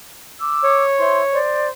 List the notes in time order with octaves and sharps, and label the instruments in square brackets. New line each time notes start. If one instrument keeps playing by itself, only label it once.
[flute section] D6 E6
[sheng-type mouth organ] C#5
[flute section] E4 C5 C6
C5 D5